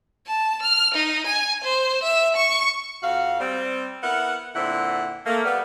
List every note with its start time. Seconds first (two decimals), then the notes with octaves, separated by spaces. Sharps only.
0.26 A5
0.62 F6
0.94 D#4
1.27 G#5
1.64 C5
2.03 E5
2.36 C#6
3.02 F2 F#4 F5
3.40 G3 C4
4.03 B3 E4 A#4 F#5
4.56 A#2 D3 C4 E4 F#5
5.26 A3 A#3
5.45 G3 B3